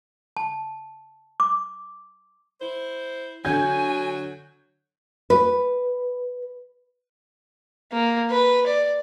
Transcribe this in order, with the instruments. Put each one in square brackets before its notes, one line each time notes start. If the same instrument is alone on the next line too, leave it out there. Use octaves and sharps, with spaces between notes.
[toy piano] A5
D6
[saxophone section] E4 C5
[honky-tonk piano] D3 G6 G#6 [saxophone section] F#3 F#4 [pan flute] G#5
[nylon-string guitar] B4
[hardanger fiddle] A#3
B4
D5